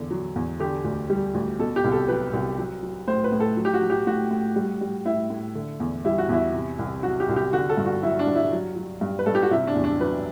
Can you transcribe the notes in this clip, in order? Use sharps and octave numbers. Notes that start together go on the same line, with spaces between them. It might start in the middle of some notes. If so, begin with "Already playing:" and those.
Already playing: E2 D3
F#3
E2
D3 G4
D2
G3
D2
B2 A4
G4
C2
A4
F#3 B4
C2
F#3
F#3
A2 C5
B4
A2
A4
F#3
G4
F#4
F#3
G4
A2 F#4
A2
G3
G3
A2 E4
A2
D3
E2
G3 E4
F#4
E2 E4
C3
C2
F#3 F#4
G4
C2
G4
D3 F#4
A4
G2
F#4
F#3 E4
D4
G2
E4
F#3
F#3
G2
B4
G2 A4
G4
F#4
C3 E4
D4
E2
D4
F#3 B4